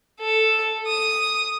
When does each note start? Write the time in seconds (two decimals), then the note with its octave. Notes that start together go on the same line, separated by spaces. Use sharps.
0.20 A4
0.87 D#6